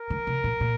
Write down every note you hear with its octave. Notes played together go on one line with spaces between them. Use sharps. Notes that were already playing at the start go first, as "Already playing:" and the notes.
Already playing: A#4
D3
C3
A#2
A#2